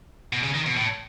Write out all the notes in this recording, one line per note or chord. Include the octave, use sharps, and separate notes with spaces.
B2
C#3
D#3
B2
A2